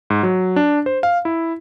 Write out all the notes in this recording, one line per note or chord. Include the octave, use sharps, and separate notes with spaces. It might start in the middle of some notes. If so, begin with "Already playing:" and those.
G#2
F#3
D4
C5
F5
E4